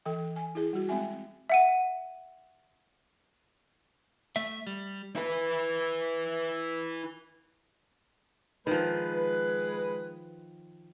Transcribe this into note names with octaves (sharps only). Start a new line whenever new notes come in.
E3 A4 G5
G#5
E4 G#4
G3 F#4
G#3 C4 F#4 E5 G#5
E5 F#5 D#7
A3 E5
G3
E4 B4
D#3 F3 G#3 B4